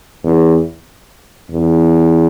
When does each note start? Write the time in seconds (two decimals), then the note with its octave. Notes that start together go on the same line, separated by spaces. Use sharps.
0.24 E2
1.51 E2